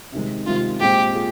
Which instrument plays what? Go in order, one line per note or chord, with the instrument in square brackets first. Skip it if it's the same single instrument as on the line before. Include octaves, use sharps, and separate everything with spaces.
[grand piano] C3 D#3 G#3
[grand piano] C3 D#3 G#3 [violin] F4
[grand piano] A#2 G#3 C4 F4 G#4 [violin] G4
[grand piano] F4 G#4